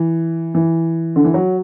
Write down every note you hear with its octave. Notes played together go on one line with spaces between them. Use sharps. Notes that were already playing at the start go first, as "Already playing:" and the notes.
Already playing: E3
E3
D3
E3
F#3